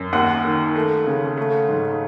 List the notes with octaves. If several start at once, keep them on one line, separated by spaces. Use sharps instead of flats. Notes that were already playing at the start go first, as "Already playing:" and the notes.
Already playing: F#2
D#2 F#5
D#3
A3
C#3
A3
G#2